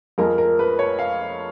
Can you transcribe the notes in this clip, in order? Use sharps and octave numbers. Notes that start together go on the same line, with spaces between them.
F2 F3 G#3 A#4
A#4
B4
C#5
F5